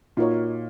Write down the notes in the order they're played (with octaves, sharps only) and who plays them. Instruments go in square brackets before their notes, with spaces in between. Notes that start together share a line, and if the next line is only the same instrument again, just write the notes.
[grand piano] A#2 [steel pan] D#4 F#4 A#4 C#5